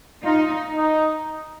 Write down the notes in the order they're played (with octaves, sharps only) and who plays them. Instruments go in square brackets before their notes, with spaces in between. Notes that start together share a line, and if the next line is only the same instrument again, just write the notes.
[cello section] D#4 [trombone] F4
[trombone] D#4